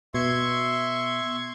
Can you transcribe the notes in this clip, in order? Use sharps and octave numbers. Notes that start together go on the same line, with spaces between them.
B2 E5 C6 C#6 G#6